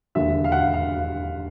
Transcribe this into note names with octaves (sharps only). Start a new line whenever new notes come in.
E1 D#2 D3 E5
F5
F#5
F5
F5